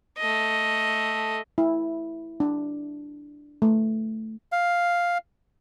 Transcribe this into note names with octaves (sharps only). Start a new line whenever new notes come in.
A3 D#5
E4
D4
A3
F5